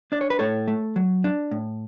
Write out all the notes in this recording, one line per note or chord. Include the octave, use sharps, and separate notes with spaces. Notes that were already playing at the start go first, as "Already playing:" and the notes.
D4 D5
C#5
B4
A2 A4 C#5
A3
F#3
D4
A2